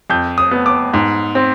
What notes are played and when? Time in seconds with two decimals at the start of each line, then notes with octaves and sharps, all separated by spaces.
0.10 F2 G6
0.38 D#6
0.51 B3
0.66 D6
0.94 G#2
1.35 C4